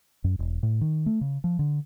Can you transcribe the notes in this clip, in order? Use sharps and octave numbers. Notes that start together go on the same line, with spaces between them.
F#2
E1
A2
D#3
A3
C#3
F3
D3